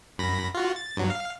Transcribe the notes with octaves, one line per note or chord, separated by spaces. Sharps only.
F#2 B5 A#6
F4 F#4
A6
G2 F#3
F5